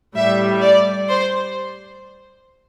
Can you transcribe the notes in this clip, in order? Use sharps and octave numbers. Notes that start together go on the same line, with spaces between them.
A2 G3 E5
D5
C5